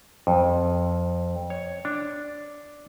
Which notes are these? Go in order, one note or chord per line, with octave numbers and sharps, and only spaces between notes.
F2
C#5
D4